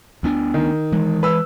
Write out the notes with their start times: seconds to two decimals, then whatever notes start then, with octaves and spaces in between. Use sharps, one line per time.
0.23 D2 B3 D4
0.54 D#3
0.92 E3 G#3
1.23 B4 E6